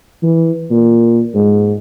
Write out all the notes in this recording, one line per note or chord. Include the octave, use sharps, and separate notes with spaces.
E3
A#2
G#2